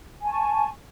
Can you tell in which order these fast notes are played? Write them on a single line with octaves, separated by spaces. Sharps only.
G#5 A5 C#6